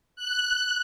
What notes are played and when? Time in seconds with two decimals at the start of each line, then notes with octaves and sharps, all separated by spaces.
0.16 F#6